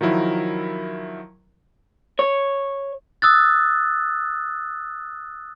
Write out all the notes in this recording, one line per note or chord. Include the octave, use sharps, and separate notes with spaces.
D#3 F3 F#3 E4 A#4
C#5
D#6 E6 F#6 A6